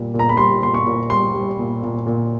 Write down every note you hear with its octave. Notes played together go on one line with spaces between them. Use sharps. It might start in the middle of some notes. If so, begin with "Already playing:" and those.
Already playing: A#2 G3
A#2
A#5
B5
G3 C6
A#2 C6
C#6
A#2
G3 C6
G3
A#2
A#2
A#2